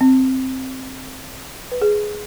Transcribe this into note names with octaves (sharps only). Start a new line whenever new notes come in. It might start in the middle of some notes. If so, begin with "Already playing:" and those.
C4
B4
G#4